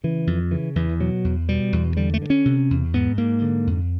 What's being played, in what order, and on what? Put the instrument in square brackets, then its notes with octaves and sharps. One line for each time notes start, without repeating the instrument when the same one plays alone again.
[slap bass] C#3 E3
F2
C#3 E3
E2 E3
B2 F#3
E2
B2 G3
E2
D3 G3
A3
G2
C#4
C3
E2
G#2 B3
G#2 A#3
D3
F2